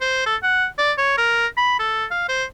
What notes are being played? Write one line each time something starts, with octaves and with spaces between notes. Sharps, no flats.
C5
A4
F#5
D5
C#5
A#4
B5
A4
F5
C5